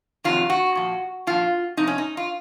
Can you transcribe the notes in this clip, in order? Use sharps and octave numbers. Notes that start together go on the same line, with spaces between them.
F2 C3 D#3 F#3 F4
F#4
A#2 F3
A#2 F3 F4
F2 C3 D#4
C#4
D#4
F4